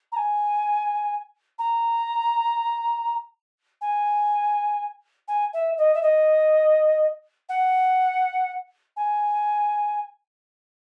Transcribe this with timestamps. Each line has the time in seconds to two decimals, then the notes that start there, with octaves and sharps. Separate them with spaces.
0.12 A#5
0.16 G#5
1.58 A#5
3.81 G#5
5.28 G#5
5.53 E5
5.78 D#5
5.94 E5
6.02 D#5
7.49 F#5
8.96 G#5